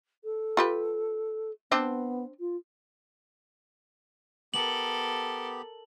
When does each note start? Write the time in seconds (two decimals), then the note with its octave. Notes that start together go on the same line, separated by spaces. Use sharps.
0.24 A4
0.57 F4 G4 B4
1.72 B3 C4 D4 C5
2.40 F4
4.54 B3 G4 A4 A#4 F#7